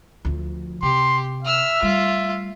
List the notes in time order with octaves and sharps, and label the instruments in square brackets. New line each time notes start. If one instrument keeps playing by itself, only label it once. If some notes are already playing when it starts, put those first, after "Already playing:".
[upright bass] D2 F3
[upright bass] C3 [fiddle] G4 [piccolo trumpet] C6
[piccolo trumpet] E5 [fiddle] E6 F6
[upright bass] G3 A3 [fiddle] F4